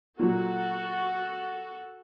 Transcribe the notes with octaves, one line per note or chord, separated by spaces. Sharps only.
A#2 F#3 F#4 A4